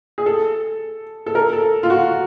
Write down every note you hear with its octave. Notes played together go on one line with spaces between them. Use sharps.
G#4
A4
A4
A#4
A4
F4
F#4